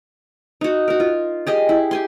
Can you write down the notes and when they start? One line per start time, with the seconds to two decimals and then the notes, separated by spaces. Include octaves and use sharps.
0.61 D#4 F#4
0.88 F#4 A#4
1.00 F4
1.47 G4 G#4 D#5
1.69 E4
1.91 G4 G#5 C6